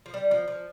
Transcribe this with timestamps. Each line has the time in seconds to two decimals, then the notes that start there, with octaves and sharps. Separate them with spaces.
0.06 F3
0.14 G3
0.31 F3
0.48 F3